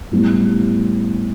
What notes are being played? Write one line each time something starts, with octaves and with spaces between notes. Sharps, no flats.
A2 G3 B3